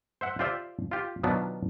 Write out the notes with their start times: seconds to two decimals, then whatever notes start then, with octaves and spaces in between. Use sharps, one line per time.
0.21 C5 E5 F#5
0.39 F4 G4 C5 D5 E5
0.91 F4 G4
1.23 B2 D#3 F3 F#3 B3 D4